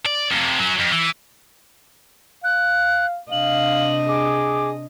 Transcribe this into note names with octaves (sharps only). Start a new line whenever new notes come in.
D5
F2 C3
F#3 C#4
F2
E3
F5 F#6
C3 D4 D#5 F5 F#7
G#4 D6